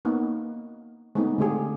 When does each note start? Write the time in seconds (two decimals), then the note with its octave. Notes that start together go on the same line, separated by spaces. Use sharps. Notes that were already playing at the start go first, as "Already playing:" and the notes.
0.05 A#3 B3 D#4
1.15 G#3 A3 B3 C4 D#4
1.38 D3 A3 G4 G#4